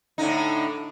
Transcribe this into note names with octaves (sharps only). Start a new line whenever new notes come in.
A2 D3 D#4